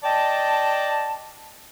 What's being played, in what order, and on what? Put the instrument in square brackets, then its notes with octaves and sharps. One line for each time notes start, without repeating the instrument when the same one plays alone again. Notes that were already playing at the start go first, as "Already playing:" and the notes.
[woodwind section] D5 D#5 G5 A5